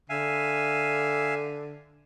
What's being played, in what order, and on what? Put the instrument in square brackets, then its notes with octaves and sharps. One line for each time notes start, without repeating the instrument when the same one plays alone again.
[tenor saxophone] D3 [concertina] E5 F5 G#5